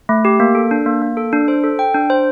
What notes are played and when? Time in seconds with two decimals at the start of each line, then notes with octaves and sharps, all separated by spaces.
0.09 A3
0.25 G4
0.40 A#3
0.55 A4
0.71 D4
0.86 A#3
1.02 A#3
1.17 A4
1.33 D4
1.48 C5
1.64 A4
1.79 G5
1.94 D4
2.10 C5